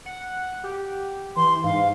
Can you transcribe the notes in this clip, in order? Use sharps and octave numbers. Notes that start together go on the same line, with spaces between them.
F#5
G4
E3 C6
G#2 F5